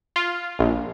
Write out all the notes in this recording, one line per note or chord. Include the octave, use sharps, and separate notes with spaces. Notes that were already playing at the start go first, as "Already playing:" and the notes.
F4
A#1